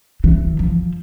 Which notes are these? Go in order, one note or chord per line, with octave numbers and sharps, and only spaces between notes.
E3
F3